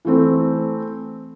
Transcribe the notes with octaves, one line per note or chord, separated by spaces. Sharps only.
E3 A3 C4